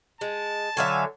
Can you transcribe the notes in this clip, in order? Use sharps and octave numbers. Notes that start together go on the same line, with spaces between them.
G#3 A5
D3 F#3 C#5 E5 F5 G#5